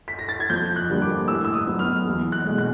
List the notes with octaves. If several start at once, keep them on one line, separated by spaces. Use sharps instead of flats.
B6
A#6
A6
G#6
F2 G6
F#6
D3 G3 A#3
D6
A2 E6
E6
D#6
F#3 B3
F6
E2
F#6
B2 G#3
F#6